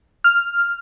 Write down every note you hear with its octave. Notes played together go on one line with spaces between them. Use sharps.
F6